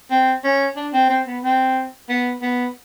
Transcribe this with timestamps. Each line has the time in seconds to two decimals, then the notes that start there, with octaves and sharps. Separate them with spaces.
0.11 C4
0.44 C#4
0.76 D4
0.93 C4
1.10 C4
1.26 B3
1.43 C4
2.09 B3
2.42 B3